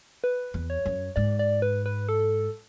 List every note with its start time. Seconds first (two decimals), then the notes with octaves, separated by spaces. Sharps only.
0.24 B4
0.54 E2
0.70 C#5
0.86 F#2
1.16 G#2 D5
1.39 D5
1.62 B4
1.86 B4
2.09 A4